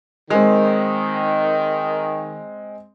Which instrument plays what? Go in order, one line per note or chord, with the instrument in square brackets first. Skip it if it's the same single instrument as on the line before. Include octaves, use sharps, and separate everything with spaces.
[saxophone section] D#3 [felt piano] G#3 C4